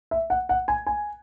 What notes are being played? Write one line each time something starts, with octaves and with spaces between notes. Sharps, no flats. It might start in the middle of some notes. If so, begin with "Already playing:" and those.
E5
F#5
F#5
G#5
G#5